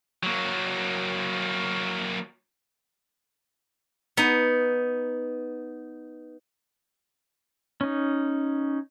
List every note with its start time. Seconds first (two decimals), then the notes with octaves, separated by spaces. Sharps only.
0.23 F#3 A#3
4.17 B3 D#4
7.81 C#4 D#4